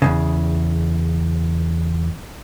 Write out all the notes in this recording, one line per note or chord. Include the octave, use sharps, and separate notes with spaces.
E2 G#2 C#3